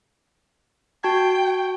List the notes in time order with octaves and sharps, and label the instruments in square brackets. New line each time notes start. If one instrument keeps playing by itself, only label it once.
[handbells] F#4 A5 G#6 [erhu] G5